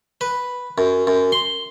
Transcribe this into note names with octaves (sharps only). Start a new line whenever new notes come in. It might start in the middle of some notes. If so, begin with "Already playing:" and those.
B4
F#2
F#2
C6